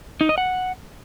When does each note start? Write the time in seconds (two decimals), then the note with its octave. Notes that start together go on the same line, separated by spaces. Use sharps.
0.21 D#4
0.29 D#5
0.38 F#5